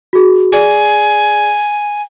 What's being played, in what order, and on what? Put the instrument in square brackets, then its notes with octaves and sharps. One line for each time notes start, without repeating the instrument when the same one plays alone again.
[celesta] F#4 G#4
[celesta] G#4 D5 [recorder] G#5